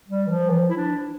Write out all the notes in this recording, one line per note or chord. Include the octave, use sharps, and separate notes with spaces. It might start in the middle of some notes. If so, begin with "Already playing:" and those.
G3
E3
F3
E3
F3
E4
D4